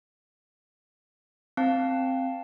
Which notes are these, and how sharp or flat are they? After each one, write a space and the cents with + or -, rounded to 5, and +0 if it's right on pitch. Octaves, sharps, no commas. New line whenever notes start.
C4 +0 F5 +0 A5 +0